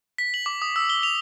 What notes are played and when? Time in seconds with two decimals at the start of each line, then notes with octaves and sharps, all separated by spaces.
0.18 B6
0.34 F#7
0.46 D6
0.62 D#6
0.76 E6
0.89 G7
1.03 F7